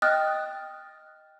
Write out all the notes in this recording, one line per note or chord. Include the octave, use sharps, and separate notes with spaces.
D#5 G5 D#6 F6 F#6 A6